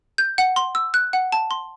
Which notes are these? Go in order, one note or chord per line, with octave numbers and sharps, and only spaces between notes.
G6
F#5
C6
E6
F#6
F#5
A5
C6